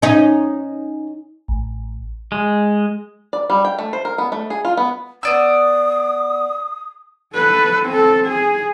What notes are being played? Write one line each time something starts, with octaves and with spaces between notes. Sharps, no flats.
C#4 D#4
A1
G#3
D5
G3
G5
A3
C5
A#4
B3
A3
G#4
F4
B3
B3 D5 D#6 E6
A4 B4
C4 A4
G#4